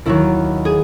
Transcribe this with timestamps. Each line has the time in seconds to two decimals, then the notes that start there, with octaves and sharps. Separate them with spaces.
0.05 D#2 D#3 F#3 E4
0.65 G#4